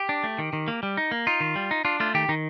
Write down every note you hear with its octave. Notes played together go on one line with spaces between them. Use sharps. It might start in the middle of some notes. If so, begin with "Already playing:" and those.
Already playing: G4
D4
A3
D#3
D#3
A#3
G3
D#4
A#3
D#4 F4
D#3
G3
D#4
D4 F4
A3 F4
D#3 G4
D#3 D#4